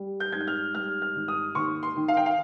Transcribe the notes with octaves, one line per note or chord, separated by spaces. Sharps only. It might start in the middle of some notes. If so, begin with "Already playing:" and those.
Already playing: G3
G6
G#2 G#6
G6
F6
G3 F6
F6
G#1
D#6
D#2 C#6
C6
D#3
F5
G5
F5